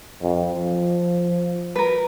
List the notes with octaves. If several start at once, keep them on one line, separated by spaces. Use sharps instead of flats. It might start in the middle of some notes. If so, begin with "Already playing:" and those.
F2
F3
A#4 B4